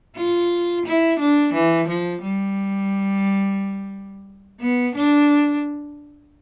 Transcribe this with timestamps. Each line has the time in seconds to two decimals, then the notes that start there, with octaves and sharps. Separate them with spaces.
0.17 F4
0.86 E4
1.20 D4
1.54 E3
1.88 F3
2.22 G3
4.61 B3
4.95 D4